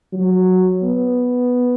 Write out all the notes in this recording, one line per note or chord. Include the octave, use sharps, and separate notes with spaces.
F#3
B3